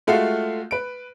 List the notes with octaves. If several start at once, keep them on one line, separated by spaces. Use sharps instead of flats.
G#3 A3 F4 F#4 F5
B4 D7